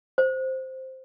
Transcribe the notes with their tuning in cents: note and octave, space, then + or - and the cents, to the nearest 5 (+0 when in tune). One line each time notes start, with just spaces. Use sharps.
C5 +0